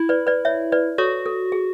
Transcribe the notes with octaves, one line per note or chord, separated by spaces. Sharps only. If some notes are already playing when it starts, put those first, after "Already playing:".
Already playing: E4
B4 D5
B4 D5
C#5 E5
B4 D5
F#4 A4 C#5
A4
G#4